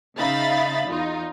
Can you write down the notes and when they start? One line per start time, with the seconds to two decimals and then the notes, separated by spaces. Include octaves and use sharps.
0.18 C#3 D#4 E5 F5 B5 A6
0.89 E2 D#4 F4